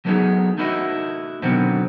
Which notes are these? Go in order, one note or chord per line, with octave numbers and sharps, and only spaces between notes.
F#3 A3 B3 C#4 D#4 G#4
A3 D#4 E4 F#4 D#5
B2 D3 D#3 F#3 B3 C4